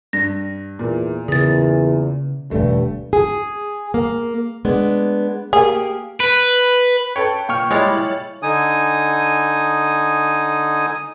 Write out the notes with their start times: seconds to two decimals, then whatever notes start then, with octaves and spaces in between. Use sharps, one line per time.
0.13 G2 A#6
0.79 E2 A#2
1.28 E2 C#3 G#4 A6
2.51 E1 D2 G2 A3
3.13 G#4
3.94 A#3
4.65 G#3 B3 D4
5.53 A#3 G4 G#4
6.20 B4
7.16 A4 B4 C#5 G5
7.49 A#2 G5 C#6 F6
7.71 G3 G#3 E4 C#5 A6
8.43 D3 D#4 G#5 D#6